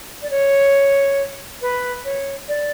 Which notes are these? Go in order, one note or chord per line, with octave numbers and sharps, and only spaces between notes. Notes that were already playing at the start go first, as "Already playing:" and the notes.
D5
C#5
B4
C#5
D5